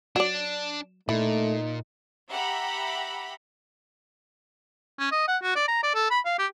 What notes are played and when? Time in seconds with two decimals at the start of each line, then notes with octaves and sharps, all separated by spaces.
0.16 F#3 D4 D5
1.09 A#2 A3 D#4 E4
2.29 G4 E5 F#5 A#5 B5
4.99 C#4
5.12 D#5
5.28 F#5
5.43 F#4
5.56 D5
5.68 A#5
5.83 D5
5.95 A4
6.11 B5
6.25 F5
6.39 G4